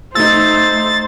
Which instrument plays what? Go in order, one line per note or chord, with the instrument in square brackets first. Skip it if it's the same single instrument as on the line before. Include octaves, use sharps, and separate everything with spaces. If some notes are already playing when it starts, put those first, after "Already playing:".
[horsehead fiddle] A3 [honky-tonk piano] D#4 E6 [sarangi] C5 [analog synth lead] A6